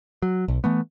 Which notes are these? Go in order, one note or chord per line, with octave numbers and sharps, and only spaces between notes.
F#3
B1
E3 A3 B3